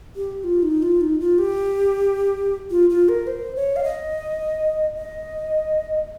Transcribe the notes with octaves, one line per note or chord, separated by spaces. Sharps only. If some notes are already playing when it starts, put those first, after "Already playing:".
G4
F4
D#4
F4
D#4
F4
G4
F4
F4
A#4
C5
C#5
F5
D#5
D#5